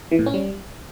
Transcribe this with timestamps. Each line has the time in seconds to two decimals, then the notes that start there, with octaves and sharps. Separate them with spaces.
0.11 E3
0.19 A2
0.26 C#4
0.34 G3